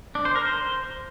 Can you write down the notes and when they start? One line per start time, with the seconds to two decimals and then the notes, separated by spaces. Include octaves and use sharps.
0.15 D4
0.25 C5
0.35 A#4
0.45 C5